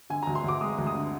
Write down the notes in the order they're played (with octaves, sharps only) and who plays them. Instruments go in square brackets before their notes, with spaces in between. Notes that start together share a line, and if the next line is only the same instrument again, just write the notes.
[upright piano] D3 G#5
A#5
D2
C6
D2 D6
G#3 D#6
D2
D#6
D3